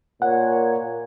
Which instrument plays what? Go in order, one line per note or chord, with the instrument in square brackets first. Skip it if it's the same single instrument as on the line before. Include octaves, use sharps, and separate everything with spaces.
[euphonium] A#2 [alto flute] C#5 [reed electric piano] F#5